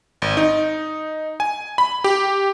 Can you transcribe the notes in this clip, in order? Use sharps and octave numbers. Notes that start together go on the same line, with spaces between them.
G#1
D#4
G#5
B5
G4